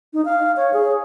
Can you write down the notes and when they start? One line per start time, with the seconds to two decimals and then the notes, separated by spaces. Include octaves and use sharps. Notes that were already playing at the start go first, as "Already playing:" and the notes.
0.13 D#4
0.25 F5
0.57 C#5
0.73 G#4